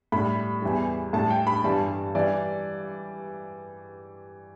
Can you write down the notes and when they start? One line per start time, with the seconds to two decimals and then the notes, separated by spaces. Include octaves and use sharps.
0.12 A2 G3 B5
0.62 E2 E3 G3
1.13 A2 G3 A5
1.30 G5
1.47 B5
1.64 G2 E3 G3 A5
2.15 E3 G3 D5